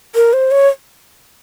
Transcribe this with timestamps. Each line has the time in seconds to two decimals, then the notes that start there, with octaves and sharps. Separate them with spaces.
0.15 A#4
0.33 C5
0.51 C#5